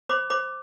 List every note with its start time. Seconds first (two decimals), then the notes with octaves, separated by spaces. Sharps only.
0.09 C5 B5 D6
0.30 C5 B5 D6